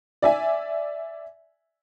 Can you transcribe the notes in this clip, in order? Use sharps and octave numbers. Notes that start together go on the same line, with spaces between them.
D5 E5 G#5